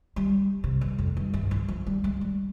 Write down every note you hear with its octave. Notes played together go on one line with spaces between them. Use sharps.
G3
C3
G2
F2
G2
G2
E3
F3
G3
G#3
G3